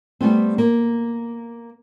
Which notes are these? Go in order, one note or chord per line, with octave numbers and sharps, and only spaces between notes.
G3 A3 B3 C4
A#3